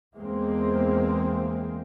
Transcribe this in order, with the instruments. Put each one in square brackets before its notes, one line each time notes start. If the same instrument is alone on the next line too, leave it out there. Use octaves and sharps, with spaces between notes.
[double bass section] E2 G#3 A#3 C4